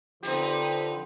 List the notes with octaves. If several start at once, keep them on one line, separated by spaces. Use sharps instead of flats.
D3 F3 C4 D#4 G4 B4